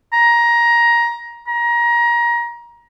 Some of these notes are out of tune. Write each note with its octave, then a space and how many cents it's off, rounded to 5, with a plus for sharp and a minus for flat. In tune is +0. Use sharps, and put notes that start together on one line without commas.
A#5 +15
A#5 +25